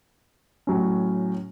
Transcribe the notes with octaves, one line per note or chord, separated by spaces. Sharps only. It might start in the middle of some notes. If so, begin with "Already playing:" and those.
A2 F#3 C#4